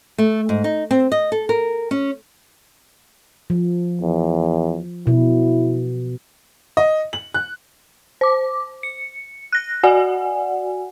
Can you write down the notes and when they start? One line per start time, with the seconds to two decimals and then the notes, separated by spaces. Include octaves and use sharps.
0.18 A3
0.49 G#2
0.64 D#4
0.91 C4
1.12 D#5
1.32 A4
1.49 A#4
1.91 C#4
3.50 F3
4.01 E2
5.07 B2 E4
6.77 D#5
7.13 F#7
7.34 F#6
8.21 C5 D6
8.83 C#7
9.52 F#6 A#6
9.83 F#4 D5 F#5 G#5